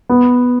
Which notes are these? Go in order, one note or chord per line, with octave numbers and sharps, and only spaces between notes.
B3